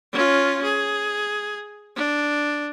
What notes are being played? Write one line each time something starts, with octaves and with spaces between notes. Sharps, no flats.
C#4 F4
G#4
D4